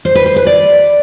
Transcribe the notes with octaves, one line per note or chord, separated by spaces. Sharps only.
C5
B4
C5
B4
D5